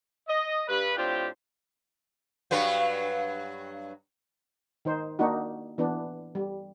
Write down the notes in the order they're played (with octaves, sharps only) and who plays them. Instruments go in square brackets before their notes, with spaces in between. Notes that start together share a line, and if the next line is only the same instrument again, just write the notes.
[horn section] D#5
G2 B4
A2 C4 D4 F4 G4
[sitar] G2 F#3 B4
[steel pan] D#3 D#4 C5
A#3 D4 D#4 F#4
E3 B3 D4
G3